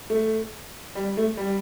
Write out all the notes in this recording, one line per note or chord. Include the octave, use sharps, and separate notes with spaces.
A3
G3
A3
G3